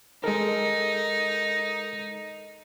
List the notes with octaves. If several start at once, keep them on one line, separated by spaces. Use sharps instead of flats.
G#3 D#4 A4 A#4